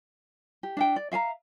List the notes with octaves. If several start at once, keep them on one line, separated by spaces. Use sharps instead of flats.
G4
D4 E5 G5
D5
E5 F5 G#5 A#5